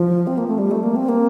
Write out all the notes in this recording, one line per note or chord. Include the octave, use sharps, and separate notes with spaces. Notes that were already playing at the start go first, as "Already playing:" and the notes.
Already playing: F3
C4
A#3
A3
G3
A3
A#3
C4
A#3